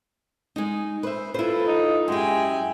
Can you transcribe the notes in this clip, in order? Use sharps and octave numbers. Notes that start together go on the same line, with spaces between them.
G#3 D#4
B4 C5 E5
E4 F4 A4 B4 C5
D#4
F#2 G#3 E4 G4 G5 G#5